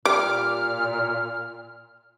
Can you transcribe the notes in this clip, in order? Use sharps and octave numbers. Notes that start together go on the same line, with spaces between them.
A#2 G3 D6 F6